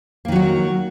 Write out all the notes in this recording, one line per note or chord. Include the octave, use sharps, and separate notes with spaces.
D#3 F#3 A#3 F#4